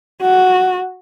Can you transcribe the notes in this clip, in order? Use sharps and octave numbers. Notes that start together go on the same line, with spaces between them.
F#4